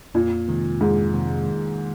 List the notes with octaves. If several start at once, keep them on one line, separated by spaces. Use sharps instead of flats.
F2 A#2
C3 D#3 G#3 C4
F2 G#2
C3 D#3 G#3 C4
D#3